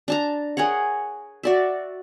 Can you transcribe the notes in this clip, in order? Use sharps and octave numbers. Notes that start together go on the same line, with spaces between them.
D4 A5 A#5
G#4 A#4 C#5 F#5
F#4 D5 E5